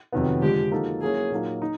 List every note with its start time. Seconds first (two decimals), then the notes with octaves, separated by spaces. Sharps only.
0.12 F2 C3 D#3 F#3 B3
0.42 D3 F3 G#3 G4
0.72 F3 A#3 D#4 F#4 A4
1.02 F#3 A#3 C#4 E4 G#4
1.31 A#2 F#3 A#3 D#4
1.62 D#4